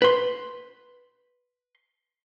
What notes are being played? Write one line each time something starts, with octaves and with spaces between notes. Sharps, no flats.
B4 C6